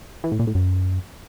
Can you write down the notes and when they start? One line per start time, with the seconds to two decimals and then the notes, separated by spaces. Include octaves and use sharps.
0.24 E3
0.32 A2
0.39 A#2
0.47 A2
0.55 F#2